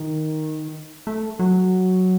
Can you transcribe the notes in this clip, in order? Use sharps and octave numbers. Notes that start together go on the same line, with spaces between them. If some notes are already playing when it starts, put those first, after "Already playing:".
Already playing: D#3
A3
F#3